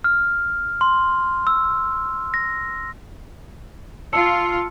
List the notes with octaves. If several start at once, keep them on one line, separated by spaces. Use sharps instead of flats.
F6
C6
E6
A#6
F4 A5 E6 C#7